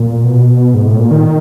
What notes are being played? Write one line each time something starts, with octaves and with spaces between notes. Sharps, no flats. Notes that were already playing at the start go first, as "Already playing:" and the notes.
Already playing: A#2
B2
G#2
A2
A#2
D#3